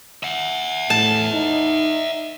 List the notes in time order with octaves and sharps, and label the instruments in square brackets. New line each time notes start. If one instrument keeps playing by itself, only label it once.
[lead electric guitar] E5 F#5
[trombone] A2 [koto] A5
[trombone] D#4